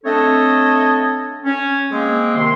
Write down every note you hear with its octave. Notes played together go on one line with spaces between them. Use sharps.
A3 C4 D4 A4 C#5 D#5
C#4
G#3 A#3 C4
C3 D#3 C6